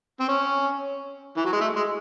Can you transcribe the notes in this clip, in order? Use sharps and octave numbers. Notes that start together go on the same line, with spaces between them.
C4
C#4
E3
F#3
G#3
A3
G#3